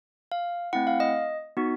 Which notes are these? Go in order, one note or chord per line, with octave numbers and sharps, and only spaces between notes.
F5
A3 C4 E4 F#5
F5
D#5
B3 D#4 F#4